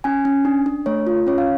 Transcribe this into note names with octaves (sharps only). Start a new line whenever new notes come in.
C#4 G#5
C#4
D4
D4
A3 C#5
F4
C#4 C#5
F5